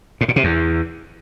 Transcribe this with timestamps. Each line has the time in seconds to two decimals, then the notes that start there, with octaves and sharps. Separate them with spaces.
0.21 A2
0.28 A#2
0.36 C3
0.44 E2